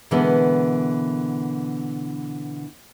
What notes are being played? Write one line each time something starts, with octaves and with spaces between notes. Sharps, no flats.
B2 D3 E3 G#3 A#3 B3